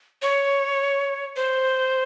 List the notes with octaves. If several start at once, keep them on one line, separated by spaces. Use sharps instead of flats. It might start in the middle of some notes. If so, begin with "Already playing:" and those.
C#5
C5